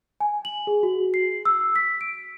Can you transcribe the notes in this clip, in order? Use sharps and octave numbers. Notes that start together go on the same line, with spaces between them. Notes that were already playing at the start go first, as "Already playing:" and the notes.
G#5
F#7
G#4
F#4
C7
E6
B6
D7